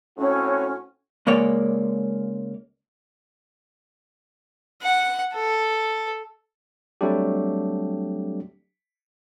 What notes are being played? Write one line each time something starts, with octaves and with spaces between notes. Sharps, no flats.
A2 C4 C#4 F#4
C#2 G#3 A#3 C#5 D5
F#5
A4
F#3 G3 A3 C4 D4 G4